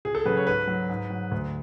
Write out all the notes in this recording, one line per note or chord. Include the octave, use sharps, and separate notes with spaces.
C#2 G#4
A4
C#3 F#3 B4
C#5
G#2 B4
F#3
G#2
F#3
D2